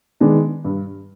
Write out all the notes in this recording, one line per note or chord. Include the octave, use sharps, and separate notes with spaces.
D#3 G#3 B3 D4
G2